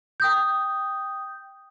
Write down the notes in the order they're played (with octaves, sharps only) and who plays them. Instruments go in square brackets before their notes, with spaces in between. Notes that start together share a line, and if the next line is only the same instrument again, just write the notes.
[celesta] G5 D#6 G6